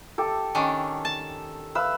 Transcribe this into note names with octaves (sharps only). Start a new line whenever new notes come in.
G4 A4
D#3 C#4 D4
A5
B4 F5 E6